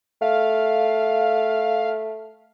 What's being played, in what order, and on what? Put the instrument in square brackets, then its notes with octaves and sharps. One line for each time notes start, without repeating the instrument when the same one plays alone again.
[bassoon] A3 [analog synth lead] F5